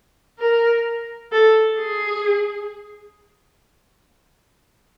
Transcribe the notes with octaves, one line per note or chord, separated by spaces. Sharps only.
A#4
A4
G#4